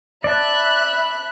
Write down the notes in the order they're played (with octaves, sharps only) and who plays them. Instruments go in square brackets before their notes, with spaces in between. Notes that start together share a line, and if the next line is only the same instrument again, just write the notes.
[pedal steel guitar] D5 A5 [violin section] E5 B5 F#6